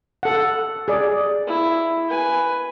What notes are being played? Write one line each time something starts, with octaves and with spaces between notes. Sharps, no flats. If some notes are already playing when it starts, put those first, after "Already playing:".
A4 F#5
G#4 D5
E4
B4 G#5